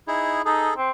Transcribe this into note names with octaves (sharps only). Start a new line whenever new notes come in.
D#4 E4 G#4
D#4 G#4 A4
C4